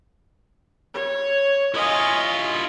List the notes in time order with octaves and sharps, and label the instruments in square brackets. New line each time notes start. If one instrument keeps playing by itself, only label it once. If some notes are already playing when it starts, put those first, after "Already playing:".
[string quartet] C#5
[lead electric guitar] E4 F4 [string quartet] D#5 G#5 C#6